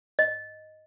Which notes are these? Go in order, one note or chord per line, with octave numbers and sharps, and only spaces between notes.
D#5